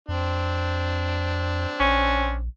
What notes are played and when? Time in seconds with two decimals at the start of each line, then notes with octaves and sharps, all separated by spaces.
0.09 F2 C4 D4
1.80 A#1 C#4